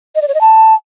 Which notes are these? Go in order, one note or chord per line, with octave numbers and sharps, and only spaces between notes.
D#5
D5
C#5
D#5
A5